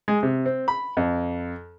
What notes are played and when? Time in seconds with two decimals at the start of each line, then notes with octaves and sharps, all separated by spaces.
0.08 G#3
0.23 C3
0.46 C4
0.68 B5
0.97 F2